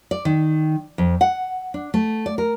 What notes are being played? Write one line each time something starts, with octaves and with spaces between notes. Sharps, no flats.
D5
D#3
F2
F#5
D4
A3
D5
A#4